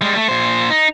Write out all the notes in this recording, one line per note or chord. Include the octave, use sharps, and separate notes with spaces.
G3 G#3
A3
A#2 C5
D#4